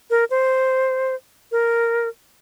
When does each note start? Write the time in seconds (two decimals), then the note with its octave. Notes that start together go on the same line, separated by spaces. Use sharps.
0.10 A#4
0.30 C5
1.52 A#4